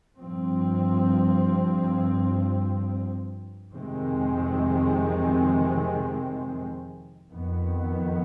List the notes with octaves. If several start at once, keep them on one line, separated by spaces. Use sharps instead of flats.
G2 F3 C4
F2 C3 D#3 G#3 C4
F2 D#3 B3